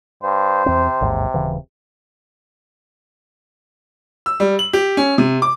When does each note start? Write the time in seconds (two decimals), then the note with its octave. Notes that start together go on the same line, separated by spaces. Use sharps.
0.23 G2 C5
0.66 E2 C3 C4
1.01 A1 D#2 G#2
1.34 D#1 C#3 E3
4.26 E6
4.40 G3
4.59 F#7
4.73 G4
4.97 C#4
5.18 C3
5.42 D6